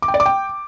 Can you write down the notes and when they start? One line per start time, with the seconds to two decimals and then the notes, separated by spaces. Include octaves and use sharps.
0.02 D6
0.08 G5
0.14 D5
0.20 D6
0.26 G5